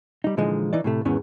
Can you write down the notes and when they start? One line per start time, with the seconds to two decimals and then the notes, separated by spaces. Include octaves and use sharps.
0.24 G3 D#4
0.37 A#2 D3 E3 F3 G#3 D#4
0.73 E3 D#4 D5
0.84 A2 C3 A3
1.05 E2 G#2 D#3 E3 B3 C#4